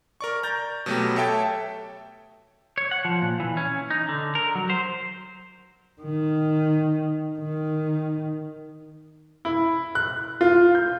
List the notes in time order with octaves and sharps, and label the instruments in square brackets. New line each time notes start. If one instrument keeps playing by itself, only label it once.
[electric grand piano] A#4 D5 C#6
A#5 G6 A6
B2 F#3 A3 B3 G4
A4 C#5 E5 G5 A5
[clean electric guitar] C#5
F#5
F3
A#2
E3
C#4
D#4
D3
A#4
F#3
C5
[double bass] D#3
D#3
[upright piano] E4
F#6
F4
G6